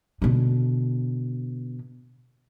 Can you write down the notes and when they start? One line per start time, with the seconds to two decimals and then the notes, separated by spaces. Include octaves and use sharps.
0.22 B2 D3